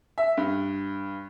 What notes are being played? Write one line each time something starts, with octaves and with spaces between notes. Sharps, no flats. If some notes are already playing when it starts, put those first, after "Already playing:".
E5
G2